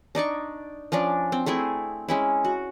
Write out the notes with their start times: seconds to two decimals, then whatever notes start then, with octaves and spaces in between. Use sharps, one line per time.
0.15 D4 D#4 D5 C#6
0.92 F3 C#4 D4 D5
1.32 C4
1.46 A3 C4 E4 G#4
2.08 G#3 C#4 E4
2.45 F#4